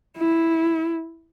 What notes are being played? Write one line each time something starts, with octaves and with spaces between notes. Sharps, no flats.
E4